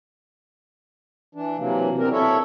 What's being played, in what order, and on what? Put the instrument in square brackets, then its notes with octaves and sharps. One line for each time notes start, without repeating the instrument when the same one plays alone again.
[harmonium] E3 D4
C3 E3 F#3 A#3
B2 C4 D4 A#4
E4 A4 C#5 E5